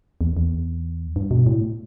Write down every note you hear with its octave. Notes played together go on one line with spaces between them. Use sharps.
E2
E2
G2
B2
A2